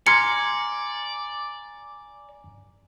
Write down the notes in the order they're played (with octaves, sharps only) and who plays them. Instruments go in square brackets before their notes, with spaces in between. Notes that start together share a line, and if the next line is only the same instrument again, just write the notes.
[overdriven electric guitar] D5 [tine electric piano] G#5 A#5 C6 [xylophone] F6 G#6 C#7